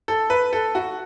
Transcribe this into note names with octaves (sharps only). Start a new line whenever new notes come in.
A4
B4
A4
F#4